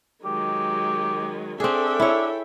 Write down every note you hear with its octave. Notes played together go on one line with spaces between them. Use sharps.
D#3 F#3 G#3 G4
C4 D4 G#4 A4 E5 G5
E4 C#5